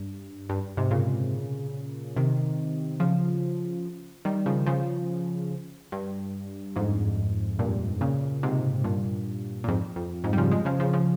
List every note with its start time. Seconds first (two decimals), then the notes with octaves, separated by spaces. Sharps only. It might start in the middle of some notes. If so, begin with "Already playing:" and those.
Already playing: G2
0.49 G2
0.77 G#2 C3
0.91 A#2 C#3
2.17 C3 D#3
3.00 C#3 F3
4.25 D#3 G3
4.46 C#3 F3
4.67 C#3 F3
5.92 G2
6.76 F2 G#2
7.59 G2 A#2
8.01 A#2 C#3
8.43 G#2 C3
8.84 G2 A#2
9.64 A#2
9.68 F2 G#2
9.96 F2
10.24 F2 G#2
10.33 G3
10.38 C#3 F3
10.51 F3 G#3
10.65 C#3 F3
10.80 C#3 F3
10.93 C#3 F3